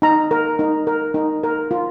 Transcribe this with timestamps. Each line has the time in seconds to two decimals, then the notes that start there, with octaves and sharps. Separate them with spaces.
0.02 D#4 A#5
0.31 A#4
0.59 D#4
0.87 A#4
1.14 D#4
1.43 A#4
1.71 F4